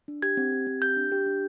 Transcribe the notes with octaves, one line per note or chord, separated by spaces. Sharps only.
D4
G4 G#6
C4
G4
C4
G4 G6
D4
G4
D4